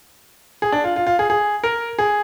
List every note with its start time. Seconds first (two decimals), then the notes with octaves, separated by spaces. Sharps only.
0.62 G#4
0.72 D4
0.84 F4
0.96 F4
1.07 F4
1.19 G#4
1.30 G#4
1.64 A#4
1.99 G#4